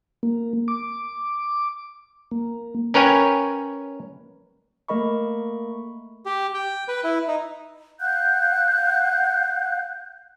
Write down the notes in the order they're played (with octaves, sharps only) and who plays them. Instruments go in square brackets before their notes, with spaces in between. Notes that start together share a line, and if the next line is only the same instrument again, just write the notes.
[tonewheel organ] A#3
D6
A#3
[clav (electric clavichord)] C#4 A#4 B4 C#5 G5 G#5
[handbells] A3 A#3 A#4 D#5 B5 C#6
[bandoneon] G4
G5
B4
E4
D#4
[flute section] F5 F#5 F#6 G6